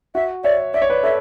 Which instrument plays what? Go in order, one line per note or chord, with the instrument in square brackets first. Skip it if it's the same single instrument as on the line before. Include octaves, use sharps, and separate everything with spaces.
[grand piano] F#4 [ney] E5
[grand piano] C#5 E5 [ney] D5
[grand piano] D5 [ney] E5
[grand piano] C#5
B4 D5
[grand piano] A4 C#5 [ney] E5